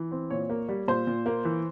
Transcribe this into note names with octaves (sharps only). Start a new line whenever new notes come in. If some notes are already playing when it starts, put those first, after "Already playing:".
Already playing: E3
C4
A#2 C#5
A#3
G3
A#2 C5
A#2
A#3
E3